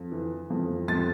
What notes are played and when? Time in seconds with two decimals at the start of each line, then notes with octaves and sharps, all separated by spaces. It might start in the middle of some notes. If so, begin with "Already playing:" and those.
Already playing: F2
0.12 E3
0.50 F2
0.88 F2 A6